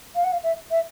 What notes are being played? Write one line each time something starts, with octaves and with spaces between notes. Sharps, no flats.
F5
F#5
F5
E5
E5